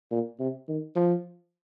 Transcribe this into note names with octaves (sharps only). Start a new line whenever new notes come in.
A#2
C3
D#3
F3